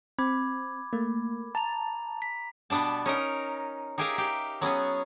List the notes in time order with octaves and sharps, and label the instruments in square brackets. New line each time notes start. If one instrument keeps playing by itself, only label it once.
[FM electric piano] C4 [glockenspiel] B5 D6 G#6
[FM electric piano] A3 A#3
[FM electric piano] A5 [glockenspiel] A#5 F7
[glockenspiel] B6
[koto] B2 G3 B3 D4 A5
C#4 D#4 A#4
D#4 G4 G#4 A#4 E5 F5
G4
F#3 B3 C#4 G#4